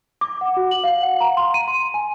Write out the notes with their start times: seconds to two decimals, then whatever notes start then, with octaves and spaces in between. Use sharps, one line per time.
0.21 D6
0.41 F#5
0.57 F#4
0.71 F#7
0.84 F5
1.02 F#5
1.20 A#5
1.37 C6
1.54 D#7
1.68 C6
1.94 G#5